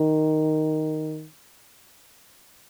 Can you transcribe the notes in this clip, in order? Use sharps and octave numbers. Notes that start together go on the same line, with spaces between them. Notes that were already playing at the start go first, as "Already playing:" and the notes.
Already playing: D#3